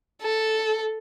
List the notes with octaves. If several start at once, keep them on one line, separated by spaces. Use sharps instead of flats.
A4